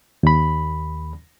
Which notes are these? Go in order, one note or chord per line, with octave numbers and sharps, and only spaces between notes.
D#2 B5